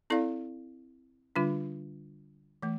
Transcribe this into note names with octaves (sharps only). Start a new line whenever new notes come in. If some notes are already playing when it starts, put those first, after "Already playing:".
C4 E4 A4 D5 F5
D3 G3 D4 F4
E3 A3